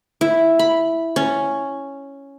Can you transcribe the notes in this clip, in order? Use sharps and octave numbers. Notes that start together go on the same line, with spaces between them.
E4
B5
C#4